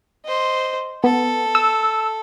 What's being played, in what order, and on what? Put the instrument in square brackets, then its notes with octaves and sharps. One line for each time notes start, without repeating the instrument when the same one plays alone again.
[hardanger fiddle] C5 D#5
[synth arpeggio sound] B3 [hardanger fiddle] A4
[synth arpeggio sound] E6